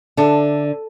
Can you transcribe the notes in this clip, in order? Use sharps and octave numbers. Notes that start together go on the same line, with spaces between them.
D3 D4 A4 E5 A5